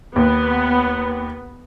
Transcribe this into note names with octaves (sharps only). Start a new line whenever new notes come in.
D#2 B3